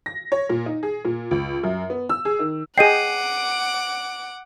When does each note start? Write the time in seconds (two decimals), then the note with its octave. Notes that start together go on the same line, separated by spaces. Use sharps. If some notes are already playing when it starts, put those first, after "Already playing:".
0.06 A#6
0.32 C#5
0.49 A#2
0.66 D#4
0.83 G#4
1.05 A#2
1.31 C#2
1.63 F#2
1.90 B3
2.09 E6
2.25 G#4
2.39 D#3
2.78 G#4 D#5 F#5 G5 D6 C7 D#7